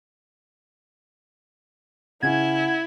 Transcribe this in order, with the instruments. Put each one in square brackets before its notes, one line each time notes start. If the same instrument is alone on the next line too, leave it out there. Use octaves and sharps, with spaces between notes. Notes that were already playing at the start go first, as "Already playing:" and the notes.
[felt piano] C#3 C#4 [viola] E4 [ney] F#5 [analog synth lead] G#6